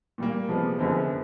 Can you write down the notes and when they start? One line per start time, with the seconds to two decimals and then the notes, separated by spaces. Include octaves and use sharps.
0.18 A#2 G3 A#3
0.49 C3 F3 G#3 B3
0.79 F#2 D3 F3 G#3 B3